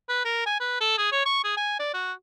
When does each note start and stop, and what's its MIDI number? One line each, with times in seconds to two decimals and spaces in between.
0.09 0.22 71
0.25 0.44 70
0.46 0.56 80
0.60 0.79 71
0.81 0.95 69
0.98 1.08 68
1.12 1.21 73
1.26 1.44 85
1.44 1.55 68
1.57 1.79 80
1.79 1.90 74
1.94 2.13 66